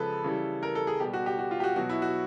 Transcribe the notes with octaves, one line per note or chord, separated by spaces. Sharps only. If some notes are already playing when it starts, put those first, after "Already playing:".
Already playing: C#3 F3 G#3 A4 B4
C#3 E3 G3
A#4
A4
G#4
B2 G3 G4
F#4
G4
F#4
F4
G4
F#4
B2 F#3 F#4
E4
F#4